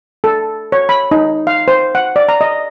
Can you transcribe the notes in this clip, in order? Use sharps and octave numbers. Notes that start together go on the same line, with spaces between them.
A4
C#5
B5
D#4
F5
C5
F#5
D5
A#5
D#5